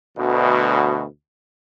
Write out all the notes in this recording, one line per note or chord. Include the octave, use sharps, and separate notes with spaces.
D2 B2